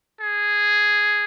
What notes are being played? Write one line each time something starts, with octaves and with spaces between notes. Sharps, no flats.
G#4